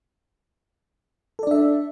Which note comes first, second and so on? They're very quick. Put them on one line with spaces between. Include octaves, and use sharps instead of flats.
A4 D5 D4 E5